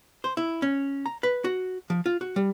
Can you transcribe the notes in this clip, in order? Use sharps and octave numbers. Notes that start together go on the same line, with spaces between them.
C5
E4
C#4
A#5
B4
F#4
F3
F4
F#4
G3